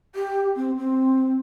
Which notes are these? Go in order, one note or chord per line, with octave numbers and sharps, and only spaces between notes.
G4
C4
C4